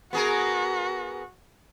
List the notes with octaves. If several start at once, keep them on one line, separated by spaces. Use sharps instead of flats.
B3 F#4 G#4 A#4